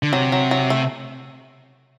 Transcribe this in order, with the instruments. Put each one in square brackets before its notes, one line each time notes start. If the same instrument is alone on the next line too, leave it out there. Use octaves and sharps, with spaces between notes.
[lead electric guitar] D3
[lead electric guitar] C3 [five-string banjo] F#3
[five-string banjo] F#3
F#3
A3